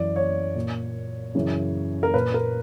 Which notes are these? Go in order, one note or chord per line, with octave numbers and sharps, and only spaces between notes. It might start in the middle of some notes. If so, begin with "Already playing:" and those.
Already playing: F#2 E3 D5
C#5
A#2
F#2 C#3 E3
A#4
A#2 B4
A#4